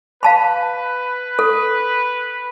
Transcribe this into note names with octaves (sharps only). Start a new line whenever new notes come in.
B4 F5 A5 B5
A4